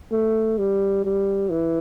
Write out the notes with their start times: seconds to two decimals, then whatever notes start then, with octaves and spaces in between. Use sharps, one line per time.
0.12 A3
0.58 G3
1.04 G3
1.50 E3